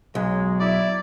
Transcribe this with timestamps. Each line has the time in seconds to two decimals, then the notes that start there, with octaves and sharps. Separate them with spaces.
0.15 B1 F#3 G#3
0.60 E4 D5